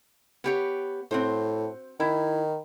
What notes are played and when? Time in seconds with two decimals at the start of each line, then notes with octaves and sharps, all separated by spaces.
0.44 B3 G4 C#5
1.11 A2 C4 F#4 C5
2.00 D#3 E4